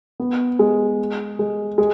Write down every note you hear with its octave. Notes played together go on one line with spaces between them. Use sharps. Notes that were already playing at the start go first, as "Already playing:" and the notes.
B3
G#3
G#3
G#3